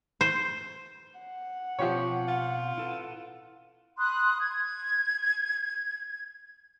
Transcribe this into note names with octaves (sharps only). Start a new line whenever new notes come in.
C5
F#5
B2 F3 C4 G4 C#5
F4
E4 A4 B4
B5 C6 D#6 F#6
G#6